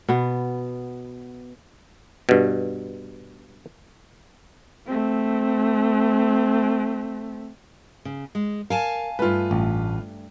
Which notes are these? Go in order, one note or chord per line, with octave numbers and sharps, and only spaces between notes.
B2 B3
G2 B2
A3 C4
C#3
G#3
A#4 F5 G#5 A5
G2 A3 F4 B4
A1